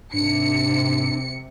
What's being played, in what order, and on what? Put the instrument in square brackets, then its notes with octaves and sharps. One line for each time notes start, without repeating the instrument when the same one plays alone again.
[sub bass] G#2 [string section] C3 C#7 [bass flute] D4